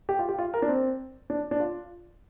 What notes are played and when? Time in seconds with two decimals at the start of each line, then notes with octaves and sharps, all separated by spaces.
0.09 G4
0.19 F4
0.29 G4
0.39 F4
0.54 A#4
0.62 D4
0.69 C4
1.30 D4
1.51 D4
1.60 F4